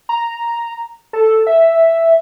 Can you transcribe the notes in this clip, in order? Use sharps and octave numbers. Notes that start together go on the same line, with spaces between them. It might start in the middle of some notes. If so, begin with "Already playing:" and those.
A#5
A4
E5